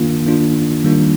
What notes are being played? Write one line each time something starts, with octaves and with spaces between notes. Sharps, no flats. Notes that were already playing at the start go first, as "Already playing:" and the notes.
Already playing: D#3 A#3 D4 F4
D#3 A#3 D4 F4
D#3 G3 A#3 D4 F4